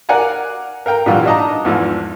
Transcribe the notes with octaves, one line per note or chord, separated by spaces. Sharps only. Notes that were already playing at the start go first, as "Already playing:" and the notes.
A#4 D5 F5 F#5 G#5 A#5
A#4 F5 G5 A#5
A#2 D3 E3 G3 F4 F#4
D4 D#4 D#5 A5 A#5
E2 G#2 E3 F3